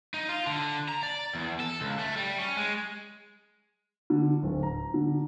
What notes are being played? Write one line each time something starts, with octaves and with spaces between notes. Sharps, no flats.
D#4
F4
D3
A#5
D5
E2
A4
C#2
A3
G3
C#4
G#3
D3
D1
A#5
D3